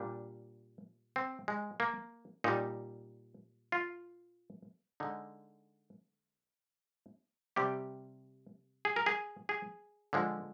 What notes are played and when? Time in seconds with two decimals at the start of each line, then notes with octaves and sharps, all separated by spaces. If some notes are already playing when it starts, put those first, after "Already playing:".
Already playing: A#2 G3 D4
1.16 C4
1.48 G#3
1.80 A#3
2.44 A#2 G3 D#4
3.72 F4
5.00 D3 G#3 D#4
7.56 C3 G3 G4
8.85 G#4
8.96 A#4
9.06 G#4
9.49 G#4
10.13 D3 F3 G#3